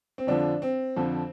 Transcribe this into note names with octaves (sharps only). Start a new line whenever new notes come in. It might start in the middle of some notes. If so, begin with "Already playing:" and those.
C4
F2 D3 F3 D4
C4
F2 D3 F3